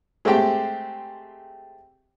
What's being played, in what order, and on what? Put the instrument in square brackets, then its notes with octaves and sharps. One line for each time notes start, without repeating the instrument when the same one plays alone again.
[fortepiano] G#3 A3 C4 G4 G5